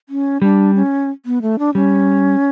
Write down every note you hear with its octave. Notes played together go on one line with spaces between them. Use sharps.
C#4
G3 D4
C#4
B3
A3
D4
G3 C#4